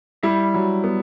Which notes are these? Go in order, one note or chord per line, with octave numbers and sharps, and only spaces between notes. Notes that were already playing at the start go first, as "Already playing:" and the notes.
G3 E4
F#3
B3